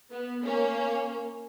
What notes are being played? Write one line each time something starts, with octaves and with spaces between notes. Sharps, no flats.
B3
A#3 C#4